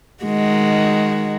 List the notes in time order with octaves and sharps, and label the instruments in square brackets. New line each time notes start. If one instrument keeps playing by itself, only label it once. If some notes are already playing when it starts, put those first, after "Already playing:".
[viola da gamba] D#3 G#3 F#4